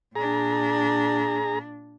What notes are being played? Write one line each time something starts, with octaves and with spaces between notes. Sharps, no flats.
A#2 D4 G#4 A#5